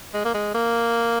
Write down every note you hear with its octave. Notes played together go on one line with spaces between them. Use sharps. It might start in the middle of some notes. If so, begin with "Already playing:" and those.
G#3
A#3
G#3
A#3